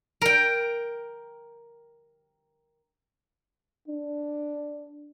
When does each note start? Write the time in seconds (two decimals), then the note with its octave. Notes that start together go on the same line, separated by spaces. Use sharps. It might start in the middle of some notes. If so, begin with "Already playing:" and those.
0.21 A#4 G5
3.88 D4